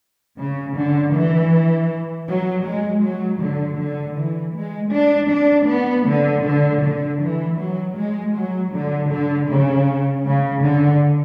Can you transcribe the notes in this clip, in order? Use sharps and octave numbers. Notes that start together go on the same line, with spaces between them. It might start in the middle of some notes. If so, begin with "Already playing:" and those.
C#3
D3
E3
F#3
G#3
F#3
D3
D3
E3
G#3
D4
D4
B3
D3
D3
D3
E3
F#3
G#3
F#3
D3
D3
C#3
C#3
D3